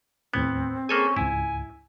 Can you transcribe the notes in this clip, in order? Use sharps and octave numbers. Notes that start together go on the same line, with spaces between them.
D#2 A2 B3 C4 G#6
A#3 C#4 G#4 A4 G#5
C#2 G#2 E4 G#5